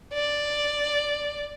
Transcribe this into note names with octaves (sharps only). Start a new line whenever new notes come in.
D5